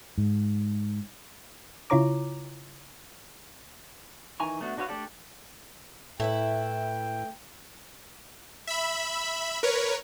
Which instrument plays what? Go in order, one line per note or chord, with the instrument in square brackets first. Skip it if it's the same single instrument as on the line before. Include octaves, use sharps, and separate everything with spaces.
[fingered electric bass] G#2
[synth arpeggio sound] C#3 E4 F4 C#5 A#5 D6
[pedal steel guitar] D#3 E3 G#5 A#5 C#6
A3 B3 D4 F#4
D4 F#4 B4 C#5 F5
A3 D4 G4 A4 D5
[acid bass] A2 [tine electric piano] A3 [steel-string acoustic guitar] E4 B4 E5 [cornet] G5
[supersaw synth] E5 B5
A#4 B4 C#5